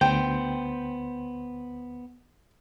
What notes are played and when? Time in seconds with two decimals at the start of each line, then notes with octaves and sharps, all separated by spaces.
0.01 D2 B3 C5 G5